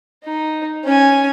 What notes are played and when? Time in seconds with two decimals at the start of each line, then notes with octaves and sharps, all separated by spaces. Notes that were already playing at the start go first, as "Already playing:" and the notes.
0.24 D#4
0.84 C#4 G#5